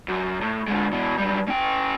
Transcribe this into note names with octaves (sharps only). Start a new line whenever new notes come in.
F#2
A2
D3 G#3
B2 E3
F#2 G3
C#4 G5